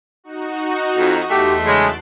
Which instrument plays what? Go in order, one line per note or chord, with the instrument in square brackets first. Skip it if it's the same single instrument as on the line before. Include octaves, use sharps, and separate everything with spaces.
[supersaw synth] D#4 F#4
[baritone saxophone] F2
[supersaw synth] E2 C6 [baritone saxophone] A3 [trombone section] G4
[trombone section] C#3 G#3 [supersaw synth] A5 F#6 D7